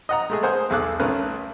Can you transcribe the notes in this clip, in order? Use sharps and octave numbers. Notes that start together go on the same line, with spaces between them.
D#5 F#5 A#5
G#3 A3 G#4
A#4 C5 F#5 G#5 D#6
B1 E2 G#4 A4 D6 F#6
B1 A3 C#4 A#4 B4 F#6